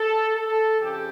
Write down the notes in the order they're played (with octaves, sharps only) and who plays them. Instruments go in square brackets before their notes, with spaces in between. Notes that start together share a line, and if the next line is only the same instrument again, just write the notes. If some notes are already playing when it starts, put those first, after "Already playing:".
Already playing: [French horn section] A4
A4
F2 C#3 G4